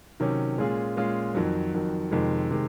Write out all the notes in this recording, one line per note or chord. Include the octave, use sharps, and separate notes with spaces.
C3 D#3 F#3 C#4
A#2 G#3 C#4 F4 G#4
A#2 G#3 C#4 F4 G#4
F2 D#3 F#3
F2 D#3 F#3
F2 C3 D#3 G#3
C3 D#3 G#3